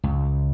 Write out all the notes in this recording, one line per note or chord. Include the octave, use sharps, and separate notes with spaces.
C#2